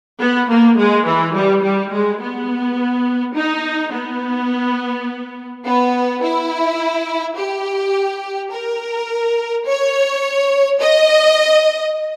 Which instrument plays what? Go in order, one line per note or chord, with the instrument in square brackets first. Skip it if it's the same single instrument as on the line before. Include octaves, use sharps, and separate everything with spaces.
[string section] B3
A#3
G#3
E3
G3
G3
G#3
B3
D#4
B3
B3
E4
G4
A#4
C#5
D#5